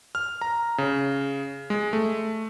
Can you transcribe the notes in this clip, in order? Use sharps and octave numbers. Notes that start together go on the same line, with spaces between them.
F6
A#5
C#3
G#3
A3